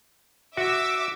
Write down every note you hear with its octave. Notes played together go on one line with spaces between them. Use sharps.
F#4 E5 D6 E6